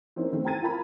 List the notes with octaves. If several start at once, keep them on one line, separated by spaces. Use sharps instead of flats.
E3 A#3 C4 C#4 D#4
D#3 E3 A3 C4
C4 G5 A#5 G#6 A6 D#7
F4 A#4 A#5 B5